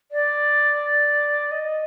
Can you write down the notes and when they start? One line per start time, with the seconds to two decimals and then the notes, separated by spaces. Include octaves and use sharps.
0.12 D5
1.51 D#5